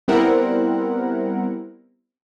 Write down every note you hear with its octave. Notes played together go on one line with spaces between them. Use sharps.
G3 B3 C4 E4 A#4 F#5